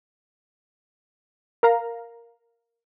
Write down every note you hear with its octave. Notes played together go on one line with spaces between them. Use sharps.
A#4 F5 A#5